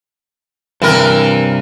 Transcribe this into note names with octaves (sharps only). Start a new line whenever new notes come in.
G2 C3 E3 A#4